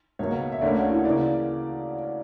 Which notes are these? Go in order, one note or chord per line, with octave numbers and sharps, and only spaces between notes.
C#2 B2 A#3 C#5
E5
D2 D3 A#3 C#4 D5
C#5
E4
C#3 E3 A#3 D5